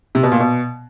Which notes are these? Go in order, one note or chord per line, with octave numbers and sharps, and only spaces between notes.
C3
B2
A#2
B2